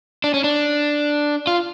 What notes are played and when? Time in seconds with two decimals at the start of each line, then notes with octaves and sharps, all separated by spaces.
0.24 D4
0.34 C#4
0.44 D4
1.47 F4